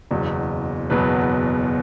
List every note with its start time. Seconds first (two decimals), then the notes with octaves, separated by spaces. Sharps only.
0.11 F#1 E2 B2 F#3
0.90 F#1 E2 B2 F#3 B4